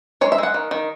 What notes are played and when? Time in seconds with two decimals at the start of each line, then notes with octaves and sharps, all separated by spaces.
0.21 G#3 C#5
0.32 E5
0.38 G#3 F#5
0.54 D#3
0.71 D#3